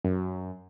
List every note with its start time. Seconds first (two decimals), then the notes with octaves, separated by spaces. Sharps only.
0.05 F#2